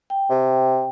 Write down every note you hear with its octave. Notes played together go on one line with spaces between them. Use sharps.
G5
C3